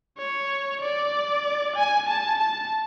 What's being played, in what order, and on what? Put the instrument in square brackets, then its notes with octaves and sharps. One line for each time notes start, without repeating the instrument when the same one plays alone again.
[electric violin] C#5
D5
G#5
A5
A5